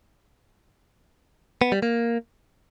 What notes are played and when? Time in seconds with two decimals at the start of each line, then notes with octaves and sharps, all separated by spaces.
1.62 B3
1.72 G3
1.82 A#3